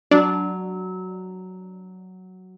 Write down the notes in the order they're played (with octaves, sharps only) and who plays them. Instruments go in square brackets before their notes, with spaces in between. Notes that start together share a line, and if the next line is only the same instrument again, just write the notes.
[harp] F#3 [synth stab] D4